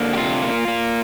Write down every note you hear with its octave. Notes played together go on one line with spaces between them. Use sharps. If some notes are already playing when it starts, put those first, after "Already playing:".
Already playing: D3 A#3
G4
C3 F4
A#3
A#3